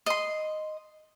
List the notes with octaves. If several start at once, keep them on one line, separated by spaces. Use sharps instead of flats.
D#5 C6